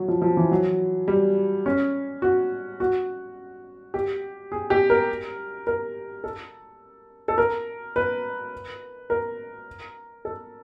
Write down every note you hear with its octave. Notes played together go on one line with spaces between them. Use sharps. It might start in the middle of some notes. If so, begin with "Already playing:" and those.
Already playing: F#3
F3
F3
E3
F#3
G3
C#4
F#4
F#4
G4
G#4
G4
A#4
A#4
A4
A4
A#4
B4
A#4
A4